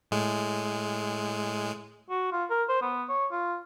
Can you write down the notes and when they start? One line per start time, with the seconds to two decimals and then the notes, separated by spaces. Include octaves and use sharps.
0.11 A2 G#3
2.09 F#4
2.32 F4
2.50 A#4
2.69 C5
2.82 B3
3.09 C#5
3.31 F4